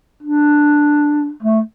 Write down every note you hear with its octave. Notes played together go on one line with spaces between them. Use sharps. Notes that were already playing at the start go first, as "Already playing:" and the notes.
D4
A3